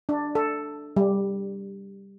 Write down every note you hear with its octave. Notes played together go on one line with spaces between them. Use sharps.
D4
A4
G3